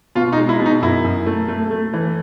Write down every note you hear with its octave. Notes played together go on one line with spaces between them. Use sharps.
B2 F4
D#4
G#3
E4
B2
D#4
F#2 E4
F#2
A3
A3
A3
E3